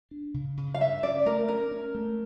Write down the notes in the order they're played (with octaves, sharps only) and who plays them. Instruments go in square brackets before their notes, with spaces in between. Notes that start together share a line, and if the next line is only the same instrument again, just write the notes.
[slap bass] D4
C#3
C#3
[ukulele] F5
[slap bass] G2 [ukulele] E5
[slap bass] C#4 [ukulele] D5
[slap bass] A3 [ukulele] A#4
[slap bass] C#4 [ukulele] A#4
[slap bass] C#4
A3